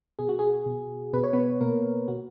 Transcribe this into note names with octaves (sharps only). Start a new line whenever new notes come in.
B2 G#4
F#4
G#4
B2
B2 B4
C#5
B3 B4
B2 A#3 A#4
B2 F#4